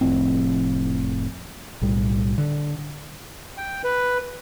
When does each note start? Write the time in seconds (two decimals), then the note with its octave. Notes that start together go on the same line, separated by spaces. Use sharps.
0.01 F1 F2 A2 C4
1.81 B1 A2 G3
2.38 D3
3.57 G5
3.84 B4